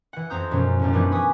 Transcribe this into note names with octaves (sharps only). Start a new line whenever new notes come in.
E3 F#5
F2 C4 A#5 D#6 G6
F#2 B2 E3 F3 G#3 C#4
A#1 F#2 A2
E3 F3 G3 B3 D4 D#4
G4 B4 G#5 C#6 D#6